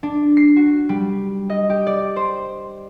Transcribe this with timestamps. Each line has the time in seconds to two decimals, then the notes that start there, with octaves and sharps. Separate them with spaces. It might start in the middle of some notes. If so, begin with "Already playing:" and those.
0.03 D4
0.37 C7
0.56 F#4
0.89 G3
1.50 D#5
1.70 G4
1.87 D5
2.16 C5